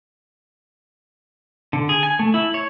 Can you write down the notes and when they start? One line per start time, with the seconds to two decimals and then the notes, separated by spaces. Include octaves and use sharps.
1.73 D3
1.89 G#4
2.03 G#5
2.19 A3
2.34 E4
2.54 C#5